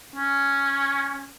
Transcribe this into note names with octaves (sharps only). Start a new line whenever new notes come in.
C#4